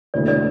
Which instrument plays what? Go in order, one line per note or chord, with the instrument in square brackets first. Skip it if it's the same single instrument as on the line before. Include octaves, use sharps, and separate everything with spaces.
[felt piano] E1 D2 D3 A3 E4 [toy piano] D5
[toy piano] D5